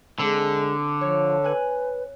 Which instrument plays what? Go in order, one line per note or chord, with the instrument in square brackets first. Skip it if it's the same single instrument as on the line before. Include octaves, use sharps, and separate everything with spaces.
[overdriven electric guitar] D3 [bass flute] G#3 [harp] C4
[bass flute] F3 [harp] C#5
[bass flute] B4 [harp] G#5 F#6 D#7